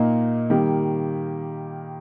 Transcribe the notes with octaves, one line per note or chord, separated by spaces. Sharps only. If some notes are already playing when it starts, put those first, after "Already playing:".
Already playing: A#2 A#3 D#4
D#3 G3 A#3 G4